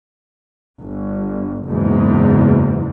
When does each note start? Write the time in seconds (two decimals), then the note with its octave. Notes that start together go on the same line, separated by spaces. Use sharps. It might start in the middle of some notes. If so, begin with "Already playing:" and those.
0.81 G1
1.66 F#1 E2 G#2